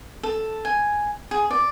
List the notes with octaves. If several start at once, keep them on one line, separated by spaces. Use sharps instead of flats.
A4
G#5
G#4
D5